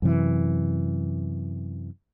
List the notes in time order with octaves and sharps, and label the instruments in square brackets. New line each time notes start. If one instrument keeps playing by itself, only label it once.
[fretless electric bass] F#2 C3 E3